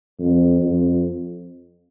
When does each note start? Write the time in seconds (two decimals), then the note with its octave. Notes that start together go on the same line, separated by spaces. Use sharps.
0.20 F2
0.61 F2